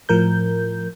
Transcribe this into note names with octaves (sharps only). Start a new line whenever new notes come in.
A2 F3 A#4 G6